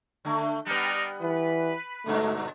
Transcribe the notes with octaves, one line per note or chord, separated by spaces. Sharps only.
D3 A3
G3 B3 D4 D#4 A#4
E3 B4
G2 B2 D3 A3